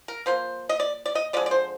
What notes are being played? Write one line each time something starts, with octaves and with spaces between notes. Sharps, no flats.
A#4
F3 A#3 C5
D#5
D5
D5
D#5
D3 F3 G#3 D5
D5
C5